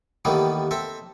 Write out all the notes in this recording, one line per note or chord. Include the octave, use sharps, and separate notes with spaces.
D#2 D#3 E3 G3 A3 B3
C4 A4 E5